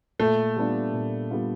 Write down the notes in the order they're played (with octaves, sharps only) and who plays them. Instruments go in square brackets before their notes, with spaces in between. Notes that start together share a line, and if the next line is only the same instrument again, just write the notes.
[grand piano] A#2 [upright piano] A3
[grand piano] G3 B3 D4 F4
A#2
G3 B3 D4 F4